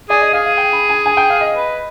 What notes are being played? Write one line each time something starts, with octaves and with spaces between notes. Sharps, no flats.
G#4 D5
D#5
G#4 F5
F5
G5
B5
G#5
G#5
G5
F5
D#5
B4